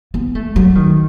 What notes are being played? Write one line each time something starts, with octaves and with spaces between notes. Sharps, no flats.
B3
A3
F#3
D#3